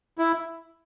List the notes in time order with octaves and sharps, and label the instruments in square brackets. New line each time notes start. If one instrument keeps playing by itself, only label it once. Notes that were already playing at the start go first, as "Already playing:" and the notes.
[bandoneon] E4